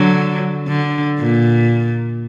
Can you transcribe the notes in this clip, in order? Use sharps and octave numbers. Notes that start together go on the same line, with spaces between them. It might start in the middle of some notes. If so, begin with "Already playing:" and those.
Already playing: D3 F#3
D3
A#2